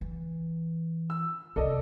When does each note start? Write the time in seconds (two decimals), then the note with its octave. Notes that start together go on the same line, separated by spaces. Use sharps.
0.01 E3
1.10 E6
1.56 C2 F2 A4 D5 D#5